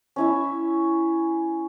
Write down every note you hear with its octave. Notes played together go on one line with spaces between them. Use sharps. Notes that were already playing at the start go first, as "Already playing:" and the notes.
C#4 E4 E5